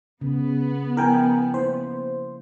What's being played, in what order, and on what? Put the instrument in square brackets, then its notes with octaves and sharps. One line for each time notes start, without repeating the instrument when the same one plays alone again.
[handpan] C#3 [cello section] B3
[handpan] F3 E4 [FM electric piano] A#4 G5 G#5
[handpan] A#3 E4 [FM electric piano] C5